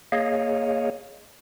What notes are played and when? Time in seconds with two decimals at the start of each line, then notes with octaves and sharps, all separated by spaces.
0.12 A#3 G#4 C#5 D#5 F5